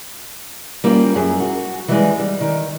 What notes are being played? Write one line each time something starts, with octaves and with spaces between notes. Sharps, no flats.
G3 A#3 C#4 F4
F#2 G#4
F#4
E3 G3 G#3
G3
D#3